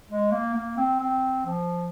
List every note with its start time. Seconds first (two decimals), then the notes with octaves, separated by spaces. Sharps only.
0.09 G#3
0.32 A#3
0.55 A#3
0.77 C4
1.01 C4
1.46 F3